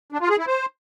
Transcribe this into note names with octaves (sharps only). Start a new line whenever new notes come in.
D4
F4
G#4
E4
C5